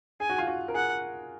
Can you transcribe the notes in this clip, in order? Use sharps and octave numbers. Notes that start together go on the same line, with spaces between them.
G#4 G#5
F#4
F4
F#4
A#4
G#4 F#5